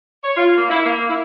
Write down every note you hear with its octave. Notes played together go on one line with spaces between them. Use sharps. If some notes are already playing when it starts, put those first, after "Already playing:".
C#5
F4
A#3
E4
A#3
E4